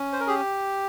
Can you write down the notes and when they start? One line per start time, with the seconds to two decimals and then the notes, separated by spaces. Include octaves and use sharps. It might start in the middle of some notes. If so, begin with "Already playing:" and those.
Already playing: C#4
0.13 C5
0.20 A#4
0.27 G4 G#4